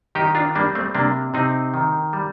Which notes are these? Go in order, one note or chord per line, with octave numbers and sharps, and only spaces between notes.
D#3 D#4 G4
D4 F4
G3 A#3 D4
A3 C4
C3 A#3 D4
C3 C4 D#4
D#3
G3